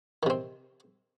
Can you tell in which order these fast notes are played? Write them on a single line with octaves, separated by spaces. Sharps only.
D#3 C3 C4